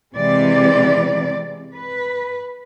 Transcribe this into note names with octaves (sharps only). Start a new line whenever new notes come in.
C3 E3 G#3 D5
B4